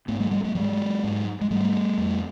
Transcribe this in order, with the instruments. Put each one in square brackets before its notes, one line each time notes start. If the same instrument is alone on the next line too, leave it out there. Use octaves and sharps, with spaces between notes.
[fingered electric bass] G#2 A3 B3
G3 A3
G3 A3
G3 A3
G#2 F#3 G#3
G#2
G#3
G#2 G3 A3
F2